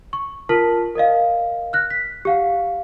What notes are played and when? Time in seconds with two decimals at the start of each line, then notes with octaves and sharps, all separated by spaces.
0.13 C#6
0.49 F4 A#4 A5 F6 B6 F#7
0.95 A#4 D5 D#5 F5
1.73 F6 F#6 A#6
1.90 B6
2.25 G4 F5 F#5